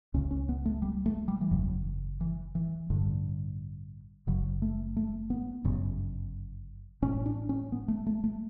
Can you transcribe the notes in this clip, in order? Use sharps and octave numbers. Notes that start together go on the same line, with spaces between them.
C#2 C#3 C#4
C#4
B3
A3
G3
A3
G3
E3
F#1 E2 C#3 F#3
E3
E3
A1 G2 D3
F#1 F#2 C#3 F#3
A3
A3
B3
G1 F#2 C#3
A1 A2 C#4
D4
C#4
B3
A3
A3
A3